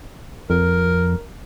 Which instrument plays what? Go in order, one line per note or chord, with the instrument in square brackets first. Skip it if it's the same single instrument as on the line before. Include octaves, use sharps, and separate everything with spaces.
[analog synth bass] F2 [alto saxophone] A#4